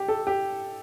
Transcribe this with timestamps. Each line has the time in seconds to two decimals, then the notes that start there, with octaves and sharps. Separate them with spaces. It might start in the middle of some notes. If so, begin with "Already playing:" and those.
Already playing: G4
0.08 A4
0.27 G4